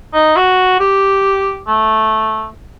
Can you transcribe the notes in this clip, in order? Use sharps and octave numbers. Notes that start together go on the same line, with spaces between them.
D#4
F#4
G4
A3